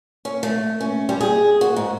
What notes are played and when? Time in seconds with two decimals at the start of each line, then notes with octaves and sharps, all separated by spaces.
0.25 C#4
0.43 A3
0.81 C#4
1.09 G3
1.21 G#4
1.61 F#4
1.76 G#2